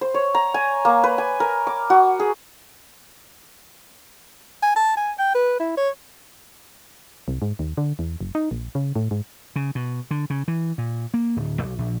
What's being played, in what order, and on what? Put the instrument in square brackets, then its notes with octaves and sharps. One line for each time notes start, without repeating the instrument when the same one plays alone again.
[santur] C5
C#5
A#5
G#5
A#3
B4
G#5
A#4
D6
F#4
G#4
[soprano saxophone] G#5
A5
G#5
G5
B4
E4
C#5
[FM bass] C2
G#2
D#2
D3
E2
F#1
D#4
A#1
C#3
A2
G#2
[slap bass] C#3
B2
D3
C#3
E3
A#2
A#3
D1
B1
A#1